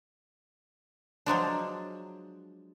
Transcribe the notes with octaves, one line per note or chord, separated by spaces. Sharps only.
F3 F#3 G#3 D4